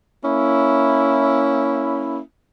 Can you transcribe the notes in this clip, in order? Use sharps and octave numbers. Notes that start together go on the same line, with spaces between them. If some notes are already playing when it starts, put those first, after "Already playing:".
A#3 C#4 E4